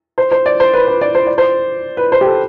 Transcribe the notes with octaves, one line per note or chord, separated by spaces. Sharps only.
C5
C5
D5
C5
B4
B4
D5
C5
D5
C5
B4
C5
G4
A4